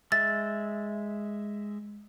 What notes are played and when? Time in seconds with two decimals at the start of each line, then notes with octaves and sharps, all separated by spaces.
0.12 G#3 E5 A6